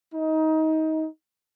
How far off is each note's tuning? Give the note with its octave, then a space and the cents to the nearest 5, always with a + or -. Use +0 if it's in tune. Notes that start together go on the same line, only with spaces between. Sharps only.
D#4 +20